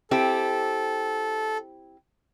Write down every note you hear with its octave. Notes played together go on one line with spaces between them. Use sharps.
C4 E4 G4 A4